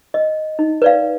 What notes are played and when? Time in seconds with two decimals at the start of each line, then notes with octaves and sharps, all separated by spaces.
0.14 D#5
0.59 D#4
0.82 B4 D5 F5